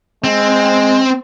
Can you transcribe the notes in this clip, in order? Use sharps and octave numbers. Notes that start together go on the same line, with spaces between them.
G#3 C4